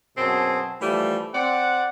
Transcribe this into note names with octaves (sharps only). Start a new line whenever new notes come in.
F#2 B2 F#3 C4 G#4 A5
E3 F3 G3 A3
C4 D5 F#5